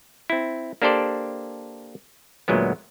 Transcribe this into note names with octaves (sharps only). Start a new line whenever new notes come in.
C4 E4
A#3 D4 G4 A4 C5 D5
D2 A#2 F#3 G#3 B3